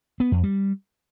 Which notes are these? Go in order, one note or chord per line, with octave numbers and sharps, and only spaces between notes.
B3
F2
G3